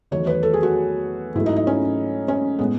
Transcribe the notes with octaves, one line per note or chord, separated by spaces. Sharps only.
E2 D#3 F#3 A3 C#5
B4
A4
G#4
F#4
G#2 F#3 A3 E4
D#4
D#4
C#4
C#4
A2 G#3 B3